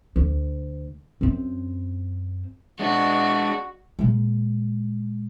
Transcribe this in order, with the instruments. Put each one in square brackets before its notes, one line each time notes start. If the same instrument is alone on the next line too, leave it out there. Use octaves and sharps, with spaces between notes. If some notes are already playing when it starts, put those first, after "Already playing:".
[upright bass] D2
F#2 C4
[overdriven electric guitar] G#3 D4 [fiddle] F#4
[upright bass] A#2 G#3